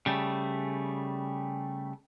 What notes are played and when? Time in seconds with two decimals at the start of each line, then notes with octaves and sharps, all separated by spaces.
0.06 C#3 G3 A3